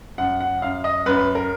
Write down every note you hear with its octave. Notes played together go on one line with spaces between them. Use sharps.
F#2 F#5
F#5
F#2 F5
D#5
F#2 B4
A#4